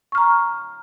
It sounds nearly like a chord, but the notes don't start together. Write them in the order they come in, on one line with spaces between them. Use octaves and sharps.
C#6 F6 A#5